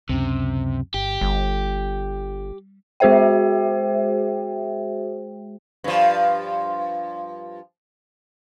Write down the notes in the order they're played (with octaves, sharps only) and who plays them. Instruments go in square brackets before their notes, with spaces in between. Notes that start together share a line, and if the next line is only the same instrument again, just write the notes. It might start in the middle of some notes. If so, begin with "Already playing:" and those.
[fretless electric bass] C#2 F#2 C#4 [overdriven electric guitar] C3
[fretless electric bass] G1 [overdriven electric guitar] G4
[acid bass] G1 [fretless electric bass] G3
[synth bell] G#3 F#4 G#4 C5 E5 G5
[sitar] G2 F3